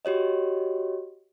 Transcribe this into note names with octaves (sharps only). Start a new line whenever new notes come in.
F#4 G4 C#5 D#5